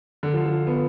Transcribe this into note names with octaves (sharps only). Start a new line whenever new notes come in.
D3
F3
F3
B3